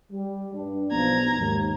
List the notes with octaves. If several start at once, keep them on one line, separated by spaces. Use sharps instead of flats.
G3
G2 D4
B1 F3 B3 A#5 G#6
D#2 G#2